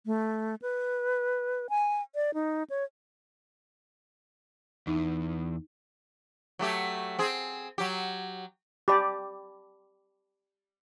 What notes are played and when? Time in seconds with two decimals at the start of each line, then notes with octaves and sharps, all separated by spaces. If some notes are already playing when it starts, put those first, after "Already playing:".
0.06 A3
0.62 B4
1.69 G#5
2.15 D5
2.34 D#4
2.70 C#5
4.87 E2 D#4
6.59 F#3 A3 G4
7.19 C4 G#4
7.78 F#3 G4
8.88 G4 D5 A5 B5 D6